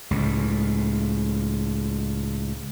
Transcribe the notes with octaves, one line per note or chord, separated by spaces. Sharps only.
C#2 A2